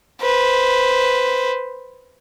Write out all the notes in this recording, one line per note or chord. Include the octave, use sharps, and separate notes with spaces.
B4 C5